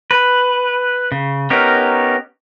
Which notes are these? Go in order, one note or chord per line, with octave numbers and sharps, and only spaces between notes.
B4
C#3
B3 C#4 D#4 G4 A#4